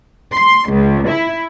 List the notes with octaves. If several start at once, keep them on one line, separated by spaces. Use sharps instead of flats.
C6
C#2
E4